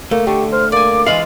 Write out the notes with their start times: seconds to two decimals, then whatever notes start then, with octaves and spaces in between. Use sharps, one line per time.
0.11 A3 A#3
0.27 D3 G4 C#6
0.52 C5 F6
0.72 A#3 D5 G#5 D6
1.06 E3 G#3 F4 F5 F#7